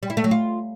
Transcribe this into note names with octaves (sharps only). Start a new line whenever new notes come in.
G3
E4
A3
F#3
F4